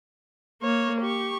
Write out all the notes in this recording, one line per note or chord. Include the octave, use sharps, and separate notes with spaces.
A#3 C#5
G4 C#6